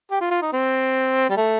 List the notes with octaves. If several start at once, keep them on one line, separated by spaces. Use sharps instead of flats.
G4
F4
F4
D#4
C4
G3
A3